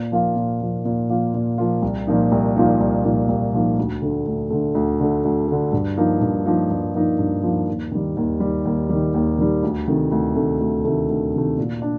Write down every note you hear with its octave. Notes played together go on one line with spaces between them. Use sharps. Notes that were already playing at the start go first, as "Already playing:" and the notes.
Already playing: A#2
F3 A#3 F4
A#2
F3 A#3 F4
A#2
F3 A#3 F4
A#2
F3 A#3 F4
C2
A#2 F3 A#3 D#4
C2
A#2 F3 A#3 D#4
C2
A#2 F3 A#3 D#4
C2
A#2 F3 A#3 D#4
D2
D3 A3
D2
D3 A3
D2
D3 A3
D2
D3 A3
G2
F3 A#3 D#4
G2
F3 A#3 D#4
G2
F3 A#3 D#4
G2
F3 A#3 D#4
D#2
D#3 G3
D#2
D#3 G3
D#2
D#3 G3
D#2
D#3 G3
D2
C3 D#3 A3
D2
C3 D#3 A3
D2
C3 D#3 A3
D2
C3 D#3 A3
A#2
D4